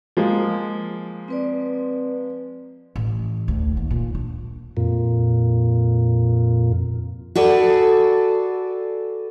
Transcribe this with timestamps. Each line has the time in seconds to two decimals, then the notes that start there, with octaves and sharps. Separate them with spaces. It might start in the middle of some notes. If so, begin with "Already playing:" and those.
0.17 F3 G#3 A#3
1.28 C4 B4 D5
2.96 A1
3.48 D2
3.77 D#2
3.91 A#2
4.15 D4
4.77 F2 A#2
7.35 F#4 G#4 A4 B4 D5